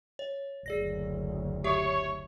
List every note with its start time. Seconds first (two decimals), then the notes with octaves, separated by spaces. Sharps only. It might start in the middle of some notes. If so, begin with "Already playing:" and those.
0.19 C#5
0.66 F#1 D2 G#4 D5 A#6
1.64 G4 C#5 E5